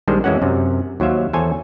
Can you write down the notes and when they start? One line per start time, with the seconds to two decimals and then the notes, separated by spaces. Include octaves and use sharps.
0.07 A#1 D#3 G3 G#3 D4 C5
0.24 F2 E3 G#3 C#4 F#4 F#5
0.42 F#2 C3
1.00 D#2 F#3 C5 E5 F5
1.33 E2 A4 C5 C#5 G#5